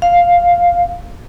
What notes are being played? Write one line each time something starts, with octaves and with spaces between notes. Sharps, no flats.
F5